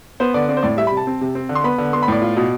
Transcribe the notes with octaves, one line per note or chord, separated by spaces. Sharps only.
B3 C5
D3 D5
C4 D5
C5
A2 D5
G3 E5
B5
C3
A5
C4
C3
C4
D3
C6
B3 B5
D3
B3 C6
B5
A2 D5
F4
B2